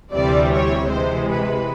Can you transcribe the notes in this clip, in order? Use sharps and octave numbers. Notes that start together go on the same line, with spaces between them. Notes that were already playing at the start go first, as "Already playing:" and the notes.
D2 C3 E3 G3 C4 D5
C#5
C3 E3 G#3 C5
B4